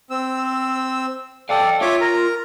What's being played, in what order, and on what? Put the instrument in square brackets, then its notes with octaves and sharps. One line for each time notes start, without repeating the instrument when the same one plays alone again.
[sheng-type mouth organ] C4 E6
[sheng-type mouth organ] A4 D5 [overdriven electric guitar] F5 G5
[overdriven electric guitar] F4 [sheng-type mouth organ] C#5 E5 D6
[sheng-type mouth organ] A#4 A#5